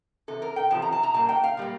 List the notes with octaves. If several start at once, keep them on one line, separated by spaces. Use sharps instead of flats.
E2 C3 A4
A#4
G5
E2 C3 F3 A5
A#5
A5
A#5
A#2 G3 A#3 A5
G5
F5
A#2 G3 A#3